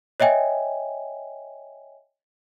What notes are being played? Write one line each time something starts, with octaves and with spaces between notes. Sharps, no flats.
C#5 D#5 E5 G5 G#5